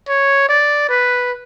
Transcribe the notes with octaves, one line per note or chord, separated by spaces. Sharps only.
C#5
D5
B4